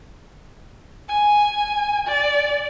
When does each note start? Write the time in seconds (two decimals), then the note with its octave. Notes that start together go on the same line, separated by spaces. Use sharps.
1.08 G#5
2.07 D5